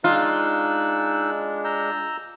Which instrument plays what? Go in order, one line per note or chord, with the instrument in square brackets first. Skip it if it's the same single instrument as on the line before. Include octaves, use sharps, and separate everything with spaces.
[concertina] G#3 D4 [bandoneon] D#4 E6 F#6 [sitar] F4
[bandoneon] A#5 E6 G6